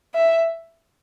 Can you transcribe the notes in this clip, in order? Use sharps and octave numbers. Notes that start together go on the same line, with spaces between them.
E5